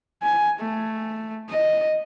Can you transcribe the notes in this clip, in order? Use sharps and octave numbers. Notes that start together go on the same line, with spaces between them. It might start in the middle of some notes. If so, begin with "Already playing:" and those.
G#5
A3
D#5